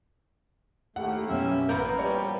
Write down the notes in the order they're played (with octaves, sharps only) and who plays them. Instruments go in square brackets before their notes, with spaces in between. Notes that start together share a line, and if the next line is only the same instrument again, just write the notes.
[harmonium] D#2 A3 [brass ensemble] A#3 E4 G4 [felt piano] F#5
[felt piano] F#2 B2 [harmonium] C#4 E5
[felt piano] A1 A#5 G6 [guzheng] A#3 B3 [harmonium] A#4 B4
[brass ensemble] B2 F3 G3 [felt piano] C#5